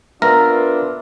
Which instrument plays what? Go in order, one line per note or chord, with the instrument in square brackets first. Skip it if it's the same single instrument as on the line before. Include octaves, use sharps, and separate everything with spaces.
[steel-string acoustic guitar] B3 [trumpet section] D4 F4 [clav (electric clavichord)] A#4 [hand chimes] E5